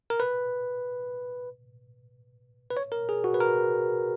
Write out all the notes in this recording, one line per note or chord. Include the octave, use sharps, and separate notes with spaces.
A#4
B4
B4
C#5
A#4
G#4
F#4
B4
A#4